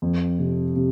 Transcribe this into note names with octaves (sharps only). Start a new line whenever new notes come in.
F2
C3
C3